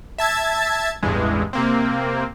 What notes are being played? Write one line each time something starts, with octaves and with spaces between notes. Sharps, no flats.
E5 A5 G#6 A6
A1 E2 G2 E3 G#3
C3 A#3 C4